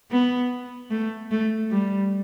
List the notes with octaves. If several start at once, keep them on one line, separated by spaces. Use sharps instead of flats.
B3
A3
A3
G3